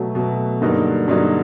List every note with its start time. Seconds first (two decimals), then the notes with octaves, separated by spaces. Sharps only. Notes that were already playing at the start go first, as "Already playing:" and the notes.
Already playing: B2 F#3 A3
0.15 B2 F#3 A3
0.61 G2 D3 F#3 A#3 D#4
1.08 G2 D3 F#3 A#3 D#4